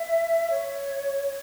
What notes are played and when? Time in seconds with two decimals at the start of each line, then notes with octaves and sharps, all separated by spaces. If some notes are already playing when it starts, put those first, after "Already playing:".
Already playing: E5
0.50 C#5